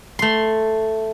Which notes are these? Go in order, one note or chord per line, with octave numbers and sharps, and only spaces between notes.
A3 C6